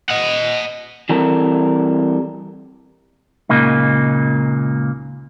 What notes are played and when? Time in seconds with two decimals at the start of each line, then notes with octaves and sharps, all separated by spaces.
0.10 D#5 F#5
1.09 E3 G3 C4 A4 A#4
3.49 C#2 A#2 C#3 A#3 D#4